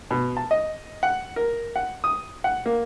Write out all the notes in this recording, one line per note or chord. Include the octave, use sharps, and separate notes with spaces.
B2
A5
D#5
F#5
A#4
F#5
D#6
F#5
A#3